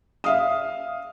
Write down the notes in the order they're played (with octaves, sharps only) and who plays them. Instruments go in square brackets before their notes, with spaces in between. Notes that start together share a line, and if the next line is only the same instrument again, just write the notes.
[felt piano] E5 F5 D#6